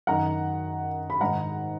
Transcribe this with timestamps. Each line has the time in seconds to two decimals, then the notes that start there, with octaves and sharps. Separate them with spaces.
0.07 F#2 D#3 F#5 A#5
1.10 B5
1.21 G#2 D#3 F#5 A#5